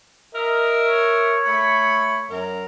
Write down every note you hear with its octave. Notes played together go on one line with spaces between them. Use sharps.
A#4 D#5 E5
C#5
A3 B5
F#2 A#4